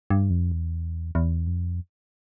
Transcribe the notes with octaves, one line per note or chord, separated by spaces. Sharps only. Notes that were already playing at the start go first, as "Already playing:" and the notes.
G2
F2
E2
E2
F2